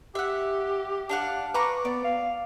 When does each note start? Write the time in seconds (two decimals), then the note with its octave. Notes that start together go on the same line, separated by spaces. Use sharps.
0.15 G4 E5 F#5
1.09 D4 F5 F#5
1.54 B4 A#5 C#6 D6
1.85 B3 D5
2.04 F5